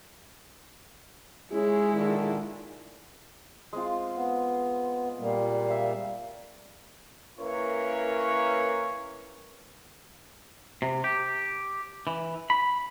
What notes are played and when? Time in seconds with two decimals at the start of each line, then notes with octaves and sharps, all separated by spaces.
1.51 G#3 C#4 E4 G#4
1.95 A#2 D3 D#3
3.73 G#3 C4 F4
4.15 B3
5.19 A#2 G3 A#3
5.68 E5 F5
7.39 A#3 C#4 E4 A#4 B4 C#5
10.82 C3
11.04 G4
12.07 E3
12.50 B5